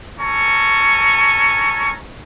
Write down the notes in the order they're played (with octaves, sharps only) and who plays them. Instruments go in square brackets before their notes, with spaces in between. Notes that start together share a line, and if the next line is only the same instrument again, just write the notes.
[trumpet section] C#4 A4 G#5 A#5 C#6